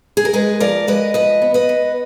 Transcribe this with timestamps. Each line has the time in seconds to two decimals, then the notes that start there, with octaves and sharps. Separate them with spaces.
0.17 G#4
0.25 A#4
0.33 G#3 G#4 B4
0.60 F3 A#4 D5
0.87 G#3 B4 D#5
1.14 F3 B4 D#5
1.42 B3
1.54 B4 D#5
1.69 B3